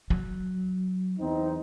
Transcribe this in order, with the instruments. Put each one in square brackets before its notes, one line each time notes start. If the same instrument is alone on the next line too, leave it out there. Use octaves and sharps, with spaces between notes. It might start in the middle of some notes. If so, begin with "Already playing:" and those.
[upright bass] F#3
[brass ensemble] E2 C4 D#4